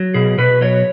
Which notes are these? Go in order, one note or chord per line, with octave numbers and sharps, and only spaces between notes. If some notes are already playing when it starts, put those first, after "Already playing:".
Already playing: F#3
B2 G#4
B2 B4
F#3 C#5